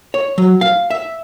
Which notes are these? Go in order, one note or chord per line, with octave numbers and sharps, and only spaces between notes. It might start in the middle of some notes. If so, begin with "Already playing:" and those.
C#5
F#3
F5
E5